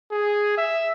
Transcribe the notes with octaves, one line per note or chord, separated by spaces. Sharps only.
G#4
E5